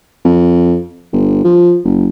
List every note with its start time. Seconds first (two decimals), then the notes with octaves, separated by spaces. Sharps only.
0.25 F2
1.13 G1
1.44 F3
1.84 F#1